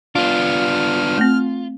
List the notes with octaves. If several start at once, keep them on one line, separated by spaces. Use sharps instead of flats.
B3 D4 F4 F6
A3 C4